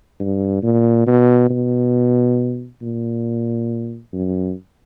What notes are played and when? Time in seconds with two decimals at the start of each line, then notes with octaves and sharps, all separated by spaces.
0.20 G2
0.63 A#2
1.07 B2
1.50 B2
2.82 A#2
4.13 F#2